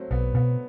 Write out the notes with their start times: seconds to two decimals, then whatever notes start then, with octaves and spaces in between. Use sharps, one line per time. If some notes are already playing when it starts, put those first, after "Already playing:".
Already playing: F#3 A3 C4
0.11 B1 B3
0.34 B2 B3